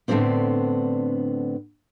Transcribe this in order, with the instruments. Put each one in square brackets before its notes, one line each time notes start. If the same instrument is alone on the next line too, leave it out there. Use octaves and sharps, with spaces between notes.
[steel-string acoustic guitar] A2 D3 G#3 B3 C4 D4